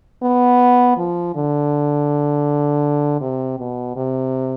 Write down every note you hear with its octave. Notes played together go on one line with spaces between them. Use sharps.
B3
F3
D3
C3
B2
C3